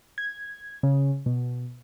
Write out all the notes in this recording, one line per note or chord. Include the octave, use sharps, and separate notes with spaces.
G#6
C#3
B2